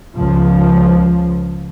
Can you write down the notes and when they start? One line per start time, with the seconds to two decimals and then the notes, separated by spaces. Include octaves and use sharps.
0.15 C#2 F3